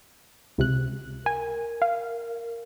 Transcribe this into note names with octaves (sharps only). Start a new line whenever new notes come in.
C#2 C3 F#6
A#4 G#5
F5